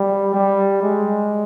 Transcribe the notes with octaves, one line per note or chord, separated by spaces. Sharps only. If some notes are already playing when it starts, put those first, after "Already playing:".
Already playing: G3
G3
G#3